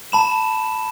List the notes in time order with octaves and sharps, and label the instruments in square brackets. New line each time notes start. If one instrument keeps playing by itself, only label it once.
[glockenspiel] A5 B5 E7